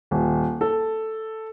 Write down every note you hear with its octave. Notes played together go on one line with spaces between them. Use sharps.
D#1
A4